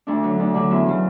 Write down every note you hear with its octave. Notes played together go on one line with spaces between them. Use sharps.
D2 D4
D3 F#3
D2 D4
D3 F#3
E2 E4
C#3 F#3